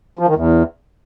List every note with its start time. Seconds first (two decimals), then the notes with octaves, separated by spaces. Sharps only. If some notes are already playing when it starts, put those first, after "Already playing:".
0.19 F3
0.27 D#3
0.35 E2